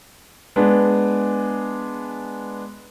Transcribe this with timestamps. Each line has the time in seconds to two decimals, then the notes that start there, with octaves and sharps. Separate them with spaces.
0.56 G#3 B3 D4